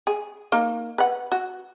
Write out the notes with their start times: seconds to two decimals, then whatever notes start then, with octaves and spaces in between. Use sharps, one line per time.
0.07 G#4
0.52 A#3 D#4
0.98 B4 F#5
1.32 F#4